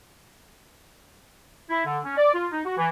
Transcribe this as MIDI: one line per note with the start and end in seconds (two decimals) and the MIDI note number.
1.70 1.85 64
1.86 1.99 50
2.04 2.16 61
2.17 2.34 74
2.34 2.47 65
2.52 2.64 63
2.65 2.77 66
2.78 2.88 52